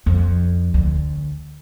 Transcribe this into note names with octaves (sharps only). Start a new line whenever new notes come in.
F2
D2